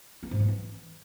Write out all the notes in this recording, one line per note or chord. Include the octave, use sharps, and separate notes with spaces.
B3
G#2
B3
E3